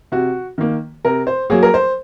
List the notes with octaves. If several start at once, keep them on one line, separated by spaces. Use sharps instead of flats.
C3 F#4
D#3 A#3
C3 A#4
C5
F#3 A#3 G#4
A#4
C5